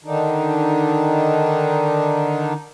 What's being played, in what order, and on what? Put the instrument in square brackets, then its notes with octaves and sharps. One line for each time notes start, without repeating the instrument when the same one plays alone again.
[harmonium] D3 D#3 D4 D#4